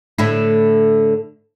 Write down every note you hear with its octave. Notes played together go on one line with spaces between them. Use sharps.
A2 D3 E4